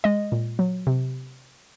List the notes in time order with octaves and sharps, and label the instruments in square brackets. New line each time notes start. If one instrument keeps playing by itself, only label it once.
[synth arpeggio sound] G#3 D#5
A#2
F#3
C3